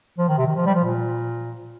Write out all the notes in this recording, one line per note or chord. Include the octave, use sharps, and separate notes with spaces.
F3
D#3
C3
D#3
F3
G3
F3
A#2